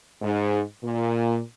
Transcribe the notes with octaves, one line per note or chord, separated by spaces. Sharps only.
G#2
A#2